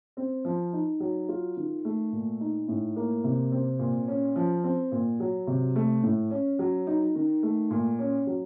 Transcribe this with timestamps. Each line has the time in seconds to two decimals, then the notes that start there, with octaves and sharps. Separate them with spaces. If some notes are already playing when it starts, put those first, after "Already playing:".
0.17 C4
0.45 F3
0.73 D#4
1.00 F#3
1.29 F4
1.57 D#3
1.85 A3
2.12 A#2
2.40 D#4
2.68 A2
2.96 A#3
3.24 C3
3.52 C4
3.79 A#2
4.08 C#4
4.36 F3
4.64 C4
4.92 A#2
5.20 F#3
5.47 C3
5.76 A3
6.03 A2
6.31 C#4
6.59 F#3
6.87 D#4
7.15 D#3
7.43 A3
7.71 A#2
7.99 C#4
8.27 F#3